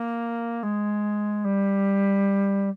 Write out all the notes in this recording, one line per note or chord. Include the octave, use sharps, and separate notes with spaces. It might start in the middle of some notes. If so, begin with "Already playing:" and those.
Already playing: A#3
G#3
G3